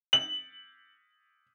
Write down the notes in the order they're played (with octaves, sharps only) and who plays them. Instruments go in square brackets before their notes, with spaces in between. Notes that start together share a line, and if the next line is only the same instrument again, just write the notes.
[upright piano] F#7